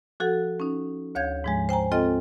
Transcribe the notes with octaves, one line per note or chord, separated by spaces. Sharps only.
F3 F#4 A4 F#5
C#4 D#4
D2 C#5 F5 G6 G#6
G#2 F3 G#3
C5 G5 G#5 A#5
C4 F4 A4 D#5 G5